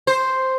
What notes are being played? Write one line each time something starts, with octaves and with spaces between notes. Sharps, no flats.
C5